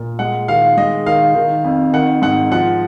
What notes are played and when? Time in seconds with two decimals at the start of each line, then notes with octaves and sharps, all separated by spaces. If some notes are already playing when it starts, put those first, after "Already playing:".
Already playing: A#2
0.19 G#3 F#5
0.48 D#3 F5
0.77 G#3 D#5
1.06 D#3 F5
1.35 D#3
1.64 F2
1.93 D#3 F#5
2.22 G#2 F#5
2.51 F3 F#5